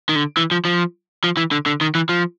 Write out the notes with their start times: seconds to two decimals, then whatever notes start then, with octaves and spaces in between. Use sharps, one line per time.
0.09 D#3
0.16 D3
0.37 E3
0.51 F3
0.65 F3
1.24 F3
1.37 E3
1.51 D3
1.66 D3
1.81 D#3
1.95 E3
2.09 F3